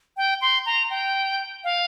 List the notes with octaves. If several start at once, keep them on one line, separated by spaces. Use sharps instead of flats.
G5
C6
A#5
G5
F5